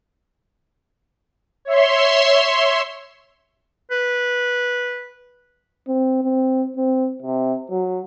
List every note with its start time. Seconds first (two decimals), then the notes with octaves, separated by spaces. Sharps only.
1.65 C#5 E5 C6
3.91 B4
5.88 C4
6.23 C4
6.77 C4
7.22 C3
7.70 F#3